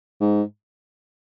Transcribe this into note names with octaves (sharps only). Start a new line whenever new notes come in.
G#2